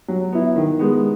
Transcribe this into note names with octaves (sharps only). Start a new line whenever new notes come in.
F#3
B3 E4
D#3
G#3 B3